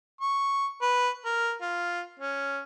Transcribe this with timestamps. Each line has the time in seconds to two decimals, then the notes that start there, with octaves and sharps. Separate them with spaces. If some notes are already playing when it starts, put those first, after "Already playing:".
0.21 C#6
0.82 B4
1.25 A#4
1.62 F4
2.20 C#4